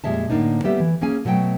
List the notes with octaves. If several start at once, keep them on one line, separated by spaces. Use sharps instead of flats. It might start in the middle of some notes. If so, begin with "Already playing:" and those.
F2 A#2 G3 G#3 E5 A5
A2 D3 D#3 A#3 D4 D#4
G3 A#3 B3 G4 A4 E5
E3
A#3 C#4 G#4 G#5
B2 F#3 A3 D#5 G5